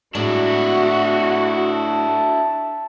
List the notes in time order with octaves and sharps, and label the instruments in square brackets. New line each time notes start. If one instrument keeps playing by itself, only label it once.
[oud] A2 G#3 [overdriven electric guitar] D4 E4 [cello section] F#4
[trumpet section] A5